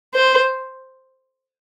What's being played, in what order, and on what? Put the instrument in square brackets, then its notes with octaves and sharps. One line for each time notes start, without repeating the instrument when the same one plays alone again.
[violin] C5